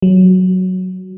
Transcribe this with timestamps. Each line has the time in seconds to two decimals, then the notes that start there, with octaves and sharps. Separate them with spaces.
0.02 F#3